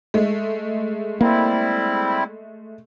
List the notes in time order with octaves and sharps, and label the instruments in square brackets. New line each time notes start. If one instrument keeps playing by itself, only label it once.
[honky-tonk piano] G#3 A3
[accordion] G3 C4 E4 [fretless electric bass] A#3